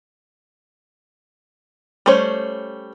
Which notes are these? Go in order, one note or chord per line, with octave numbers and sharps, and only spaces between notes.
G3 A3 C#4 C5 C#5